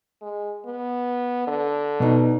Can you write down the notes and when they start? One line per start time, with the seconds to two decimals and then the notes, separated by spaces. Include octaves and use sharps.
0.22 G#3
0.66 B3
1.47 D3
2.00 B2 D#4